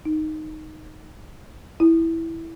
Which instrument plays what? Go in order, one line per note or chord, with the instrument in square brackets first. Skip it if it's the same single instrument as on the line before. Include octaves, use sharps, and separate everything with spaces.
[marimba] D#4
E4